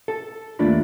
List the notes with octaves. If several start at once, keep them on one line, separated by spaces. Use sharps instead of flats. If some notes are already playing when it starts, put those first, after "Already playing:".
A4 A5
D#2 A3 A#3 D4 F4 B5